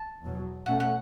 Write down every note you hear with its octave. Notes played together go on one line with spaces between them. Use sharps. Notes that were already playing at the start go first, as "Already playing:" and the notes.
Already playing: A5
E2 B2 F#3
B2 A3 C#4 F#5
F#5